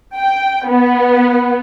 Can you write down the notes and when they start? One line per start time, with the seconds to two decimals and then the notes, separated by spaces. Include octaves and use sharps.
0.17 G5
0.68 B3